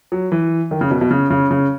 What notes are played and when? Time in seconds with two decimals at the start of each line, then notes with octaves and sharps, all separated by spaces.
0.12 F#3
0.32 E3
0.71 D#3
0.81 C#3
0.91 B2
1.01 B2
1.11 C#3
1.30 C#3
1.51 C#3